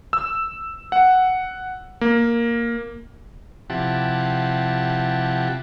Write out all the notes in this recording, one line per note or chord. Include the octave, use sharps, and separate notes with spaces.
E6
F#5
A#3
C3 F3 E4 G4 F#5 A5